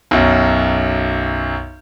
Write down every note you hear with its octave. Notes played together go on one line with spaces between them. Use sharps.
B1 F#2